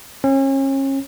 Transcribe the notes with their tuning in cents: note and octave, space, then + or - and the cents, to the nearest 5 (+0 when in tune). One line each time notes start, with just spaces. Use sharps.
C#4 -35